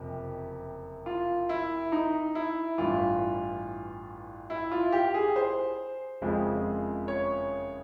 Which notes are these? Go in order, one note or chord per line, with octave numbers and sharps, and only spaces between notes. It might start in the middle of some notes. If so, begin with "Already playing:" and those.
Already playing: F#1 F2 C3
F4
E4
D#4
E4
A1 G2 E3 F4
E4
F4
G4
G#4
C5
F#1 F2 C#3 F3 G#3
C#5